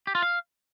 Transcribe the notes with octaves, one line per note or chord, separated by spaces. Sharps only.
G4
F4
F5